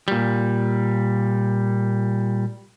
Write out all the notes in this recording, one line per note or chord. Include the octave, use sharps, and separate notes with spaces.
A#2 G3